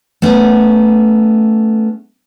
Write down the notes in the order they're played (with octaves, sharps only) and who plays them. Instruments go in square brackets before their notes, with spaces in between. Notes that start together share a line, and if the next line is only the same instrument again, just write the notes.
[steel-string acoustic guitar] A3 B3 C#4